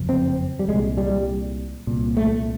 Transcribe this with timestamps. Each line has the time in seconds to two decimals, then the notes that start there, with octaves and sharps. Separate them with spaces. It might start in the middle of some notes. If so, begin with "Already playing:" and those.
Already playing: F#1 F2 C3
0.09 C4
0.59 G3
0.68 C2 A#2 G#3
0.97 G3
1.87 C2 A#2
2.17 A3